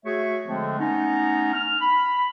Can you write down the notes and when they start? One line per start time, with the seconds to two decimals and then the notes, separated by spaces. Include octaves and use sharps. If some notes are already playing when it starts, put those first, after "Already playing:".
0.05 A3 F#4 G#4 C#5 E5
0.46 D3 F3 G#3 A3 C4
0.78 A3 B3 C#4 D#4
1.53 F6
1.80 B5